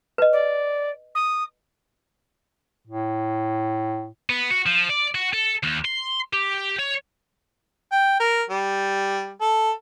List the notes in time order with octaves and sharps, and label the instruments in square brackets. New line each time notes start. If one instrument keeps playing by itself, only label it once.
[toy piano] B4 D#5
[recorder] D5
D#6
[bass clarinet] A2
[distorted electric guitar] B3
F#4
F3
D5
F#4
A4
D#2
C6
G4
C#5
[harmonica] G5
A#4
G3
A4